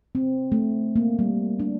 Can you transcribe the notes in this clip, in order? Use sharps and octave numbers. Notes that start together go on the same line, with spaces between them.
C4
A3
A#3
G3
D4